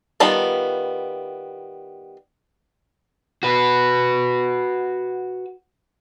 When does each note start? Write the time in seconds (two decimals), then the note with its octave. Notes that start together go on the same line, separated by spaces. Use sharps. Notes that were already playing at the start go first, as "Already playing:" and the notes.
0.20 D#3 G3 B3 F4 A5
3.43 F#4 B4